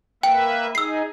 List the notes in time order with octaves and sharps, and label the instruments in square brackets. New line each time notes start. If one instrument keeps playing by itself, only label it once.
[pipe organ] A#3 B4 E5 [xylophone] G5
[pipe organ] D#4 G#4 [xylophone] E6 C7